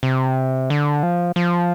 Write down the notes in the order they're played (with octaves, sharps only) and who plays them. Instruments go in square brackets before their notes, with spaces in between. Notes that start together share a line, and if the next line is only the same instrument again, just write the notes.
[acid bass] C3
D3
F3
F3